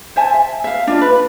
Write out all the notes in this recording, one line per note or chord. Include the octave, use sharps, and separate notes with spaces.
C5 E5 G#5 A5
E5
E5 F5
D4 F4 D#5
B4